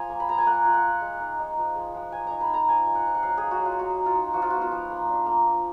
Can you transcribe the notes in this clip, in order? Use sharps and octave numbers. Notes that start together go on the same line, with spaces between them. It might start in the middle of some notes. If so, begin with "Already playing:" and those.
Already playing: F3 F4 G#5 A#5
A#3
B5
F3 A#5
G#5
A#3 F#5
F4
F#5
F4
G#3
D#4
D#4
F3
G#3
F3
A#3 G#5
D#4 A#5
B5
D#4 A#5
F3 G#5
G#3
F#5
F3
F#5
F#3 F5
A#3 G#4
F#4
F#3
F4
A#3 F#4
D#4
F4
D#4
F3 F#4
F4
B3 F#4
F4
F3
A#3
D4
A#3
F3